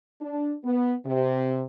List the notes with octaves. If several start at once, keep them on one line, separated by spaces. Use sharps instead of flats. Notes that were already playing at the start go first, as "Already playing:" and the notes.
D4
B3
C3